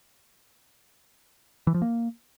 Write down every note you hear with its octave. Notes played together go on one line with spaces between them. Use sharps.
E3
F3
A#3